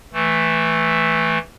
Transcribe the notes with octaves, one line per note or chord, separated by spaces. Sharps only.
E3 A3